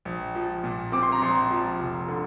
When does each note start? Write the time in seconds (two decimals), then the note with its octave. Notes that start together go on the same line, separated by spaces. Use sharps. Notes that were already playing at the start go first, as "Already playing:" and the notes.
0.05 A#1
0.35 F3
0.64 A#2
0.92 C4 D6
1.03 C6
1.12 A#5
1.22 A#1 C6
1.51 F3
1.80 F1
2.08 D3